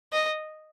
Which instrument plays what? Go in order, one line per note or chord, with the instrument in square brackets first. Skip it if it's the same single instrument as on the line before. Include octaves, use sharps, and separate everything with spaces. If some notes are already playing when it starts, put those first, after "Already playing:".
[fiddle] D#5